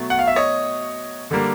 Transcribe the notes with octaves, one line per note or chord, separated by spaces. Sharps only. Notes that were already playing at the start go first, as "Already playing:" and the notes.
Already playing: B2 F#3 A3
F#5
F5
E5
C#5 D#5
D3 G3 A#3